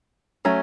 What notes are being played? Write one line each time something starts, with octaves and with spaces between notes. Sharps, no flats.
F#3 A3 C#4